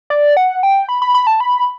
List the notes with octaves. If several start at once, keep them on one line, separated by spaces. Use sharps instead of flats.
D5
F#5
G5
B5
B5
B5
A5
B5